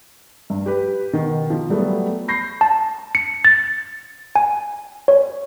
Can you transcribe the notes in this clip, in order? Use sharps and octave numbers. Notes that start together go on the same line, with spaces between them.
G2
G4 B4
B2 D#3
F3
F#3 G3 A3 B3
B5 C#6 G6 A#6 C7
A5
C#7
A6
G#5
C#5